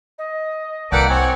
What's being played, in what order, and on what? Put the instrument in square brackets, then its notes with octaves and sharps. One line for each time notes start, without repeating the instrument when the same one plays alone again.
[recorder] D#5
[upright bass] C2 [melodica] A#3 F#5 G5 [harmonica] A4 B4 D5
[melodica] C4 C#5 [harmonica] F#5 G#5